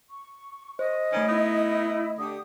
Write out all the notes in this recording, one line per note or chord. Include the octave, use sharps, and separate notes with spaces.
C#6
C5 D#5
D#3 G3 A3 C#4 G#6 D7
B3 D#4 E4
D3 G4 D#6